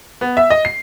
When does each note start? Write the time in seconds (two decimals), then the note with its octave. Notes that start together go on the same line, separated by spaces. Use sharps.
0.21 B3
0.37 E5
0.50 D#5
0.65 C7